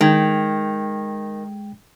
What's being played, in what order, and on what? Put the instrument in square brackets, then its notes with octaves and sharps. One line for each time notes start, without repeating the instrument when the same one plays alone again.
[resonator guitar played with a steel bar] D#3 [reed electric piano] G#3 G5 G#6